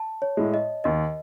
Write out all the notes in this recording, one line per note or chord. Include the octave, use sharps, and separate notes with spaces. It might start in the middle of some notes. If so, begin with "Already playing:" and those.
Already playing: A5
C#5
A2 G#3
D#5
D#2 D#5